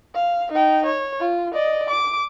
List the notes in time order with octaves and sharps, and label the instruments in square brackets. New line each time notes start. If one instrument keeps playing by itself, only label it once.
[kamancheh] F5
D#4 G5
C#5
F4
D5 D#5
D6